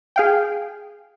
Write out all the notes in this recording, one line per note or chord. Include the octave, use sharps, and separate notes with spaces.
G#4 F5 G5